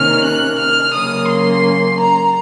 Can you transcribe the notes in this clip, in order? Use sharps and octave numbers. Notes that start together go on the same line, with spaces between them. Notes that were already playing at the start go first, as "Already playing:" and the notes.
Already playing: C3 D#3 A#3 C#4 F6
F#6
F6
C#3 F#3 A#3 C#4 D#6
C6
A#5